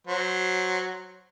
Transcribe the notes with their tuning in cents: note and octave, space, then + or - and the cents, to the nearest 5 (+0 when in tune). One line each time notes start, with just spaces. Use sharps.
F#3 +0 C5 +0